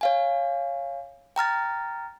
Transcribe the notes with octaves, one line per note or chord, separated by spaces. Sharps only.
C#5 F5 G#5
G5 A#5 F6 A6